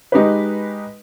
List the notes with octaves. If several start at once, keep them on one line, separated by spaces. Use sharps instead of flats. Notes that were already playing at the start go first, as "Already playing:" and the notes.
G#3 D#4 G4 B4